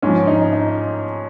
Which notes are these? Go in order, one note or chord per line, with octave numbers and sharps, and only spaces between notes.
G#2 F3 C#4
D#4
D#4